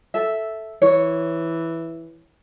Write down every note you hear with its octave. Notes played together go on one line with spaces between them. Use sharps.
A4 E5
E3 C#5